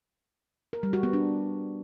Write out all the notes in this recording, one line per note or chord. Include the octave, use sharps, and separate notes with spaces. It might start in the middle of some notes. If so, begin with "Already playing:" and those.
A#4
G3
F#4
B3
D4